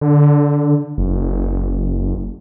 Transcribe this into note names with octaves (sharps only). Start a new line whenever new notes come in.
D3
F#1